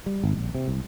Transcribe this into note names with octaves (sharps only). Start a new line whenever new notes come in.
G3
G#1
A#1
C3
C2